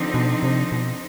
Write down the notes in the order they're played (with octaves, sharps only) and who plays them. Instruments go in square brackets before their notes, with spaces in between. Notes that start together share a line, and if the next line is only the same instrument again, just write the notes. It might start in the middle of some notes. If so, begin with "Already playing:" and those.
Already playing: [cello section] D3 F3 C4 D#4
[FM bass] B2
C3
B2